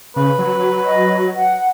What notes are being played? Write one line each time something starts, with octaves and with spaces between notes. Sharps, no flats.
C#3 B4
F#3
D#5
F#5